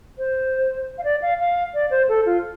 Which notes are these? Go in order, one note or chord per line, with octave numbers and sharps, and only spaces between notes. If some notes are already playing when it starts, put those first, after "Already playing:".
C5
F5
D5
F5
F5
D5
C5
A4
F4